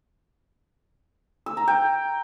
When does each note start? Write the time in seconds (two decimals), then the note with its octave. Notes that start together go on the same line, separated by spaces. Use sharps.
1.46 E6
1.57 A#5
1.68 G5